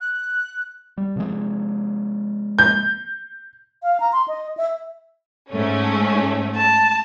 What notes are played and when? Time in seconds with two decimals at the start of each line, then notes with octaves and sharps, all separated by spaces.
0.01 F#6
0.98 G3
1.16 C3 F3 G#3
2.59 G6
3.83 F5
4.00 A#5
4.13 C6
4.28 D#5
4.57 E5
5.50 G#2 A3 C#4
6.57 A5